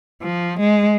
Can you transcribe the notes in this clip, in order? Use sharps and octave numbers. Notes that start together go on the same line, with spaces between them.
F3
G#3